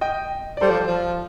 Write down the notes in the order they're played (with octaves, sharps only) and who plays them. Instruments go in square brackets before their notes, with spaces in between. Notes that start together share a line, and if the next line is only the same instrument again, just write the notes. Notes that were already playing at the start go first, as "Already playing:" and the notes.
[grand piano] D#5 G5
D5
[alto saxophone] G3 [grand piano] A4 C5
[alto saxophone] F3
F3